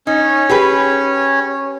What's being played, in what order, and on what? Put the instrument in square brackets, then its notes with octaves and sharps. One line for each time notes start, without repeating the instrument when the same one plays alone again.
[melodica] C#4 C#5 [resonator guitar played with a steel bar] D#4
[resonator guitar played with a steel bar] G4 G#4 B4